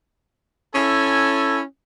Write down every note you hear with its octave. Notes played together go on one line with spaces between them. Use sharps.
C#4 E4 A4 G#5